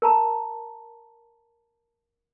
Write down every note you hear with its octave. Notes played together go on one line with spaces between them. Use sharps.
A#4 A5 A#5